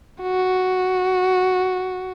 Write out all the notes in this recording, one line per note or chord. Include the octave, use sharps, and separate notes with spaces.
F#4